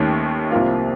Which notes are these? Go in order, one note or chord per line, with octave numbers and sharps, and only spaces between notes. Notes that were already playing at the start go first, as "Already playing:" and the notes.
Already playing: D#2 D#3 A3 C#4
C2 C3 F3 A#3 F4